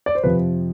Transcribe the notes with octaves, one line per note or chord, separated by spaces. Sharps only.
D5
C5
F2 C3 F3 B4